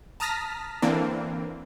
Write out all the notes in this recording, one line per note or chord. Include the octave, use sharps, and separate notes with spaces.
A5 A#5 D#6 F6 A#6 B6
D3 E3 A#3 C4 D4